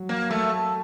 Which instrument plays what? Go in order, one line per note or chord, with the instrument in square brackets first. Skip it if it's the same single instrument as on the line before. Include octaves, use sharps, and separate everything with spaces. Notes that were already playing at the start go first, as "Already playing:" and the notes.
Already playing: [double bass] F#3
[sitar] A#3
A3